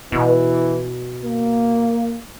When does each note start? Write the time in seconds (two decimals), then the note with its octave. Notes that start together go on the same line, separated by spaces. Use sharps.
0.12 B2 E3
1.24 A#3